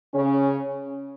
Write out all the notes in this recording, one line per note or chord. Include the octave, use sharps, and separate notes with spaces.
C#3 C#4